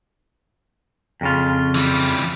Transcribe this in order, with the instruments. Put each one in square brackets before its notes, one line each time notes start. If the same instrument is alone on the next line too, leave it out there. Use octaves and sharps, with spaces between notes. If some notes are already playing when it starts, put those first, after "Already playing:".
[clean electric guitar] F2 C#3 F4
[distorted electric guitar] E3 G3